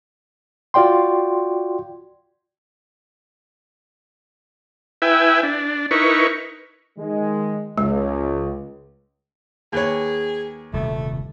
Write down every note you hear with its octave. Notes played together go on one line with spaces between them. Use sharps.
F4 F#4 D5 G5 C6
E4 B4 E5 G5 G#5
D4
D#4 E4 A#4 B4 C#6
D#3 G#3
C#2 G#3
D#2 G#4 B4 C#5
D#1 C3 G3 A3